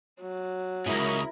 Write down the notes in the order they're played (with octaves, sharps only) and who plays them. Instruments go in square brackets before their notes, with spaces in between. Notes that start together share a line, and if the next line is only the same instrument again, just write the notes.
[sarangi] F#3
[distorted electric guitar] C#2 G#2 [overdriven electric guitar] C#3 G#4 [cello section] E4 A#4